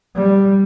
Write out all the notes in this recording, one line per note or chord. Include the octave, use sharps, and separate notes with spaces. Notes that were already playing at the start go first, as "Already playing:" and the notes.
G3